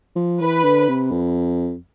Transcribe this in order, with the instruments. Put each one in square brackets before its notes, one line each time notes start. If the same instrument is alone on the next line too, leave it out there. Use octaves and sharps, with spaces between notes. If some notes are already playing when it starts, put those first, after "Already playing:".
[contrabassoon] F3
[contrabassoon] E3 [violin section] B4
[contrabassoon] D3
C3
F2